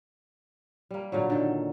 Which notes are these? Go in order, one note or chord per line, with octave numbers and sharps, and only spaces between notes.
G3 A#3
A#2 D3 F#3
D3 D#3